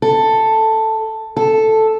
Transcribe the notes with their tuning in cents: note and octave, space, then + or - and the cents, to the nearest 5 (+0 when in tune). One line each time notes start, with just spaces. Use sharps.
A4 +5
A4 +0